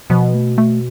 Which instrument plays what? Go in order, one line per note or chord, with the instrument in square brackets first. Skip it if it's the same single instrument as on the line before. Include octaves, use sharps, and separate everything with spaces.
[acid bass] B2 [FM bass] F3
[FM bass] A3
A3